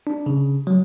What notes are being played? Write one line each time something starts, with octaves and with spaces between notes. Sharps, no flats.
D4
C#3
F#3